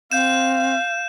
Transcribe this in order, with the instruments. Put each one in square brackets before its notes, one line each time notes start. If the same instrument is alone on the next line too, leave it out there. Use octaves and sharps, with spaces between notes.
[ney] C4 [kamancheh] F5 [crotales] G6 E7